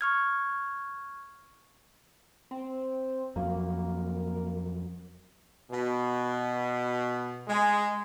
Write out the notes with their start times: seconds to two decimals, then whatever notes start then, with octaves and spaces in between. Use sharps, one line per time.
0.01 C#6 F6 G#6
2.51 C4
3.36 F2 F#3 A#3
5.71 B2
7.48 G#3